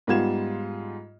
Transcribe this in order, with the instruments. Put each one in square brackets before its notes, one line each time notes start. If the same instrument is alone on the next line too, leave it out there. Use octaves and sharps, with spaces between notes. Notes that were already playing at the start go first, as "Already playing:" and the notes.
[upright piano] G#2 G3 B3 F4 G#6 E7